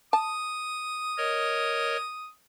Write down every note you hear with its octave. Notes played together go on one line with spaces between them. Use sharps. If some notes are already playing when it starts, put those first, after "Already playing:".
A5 D#6
A#4 C#5 D#5